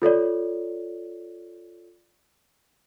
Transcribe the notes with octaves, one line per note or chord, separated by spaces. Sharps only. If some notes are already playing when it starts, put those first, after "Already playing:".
F4 A4 C#5 D5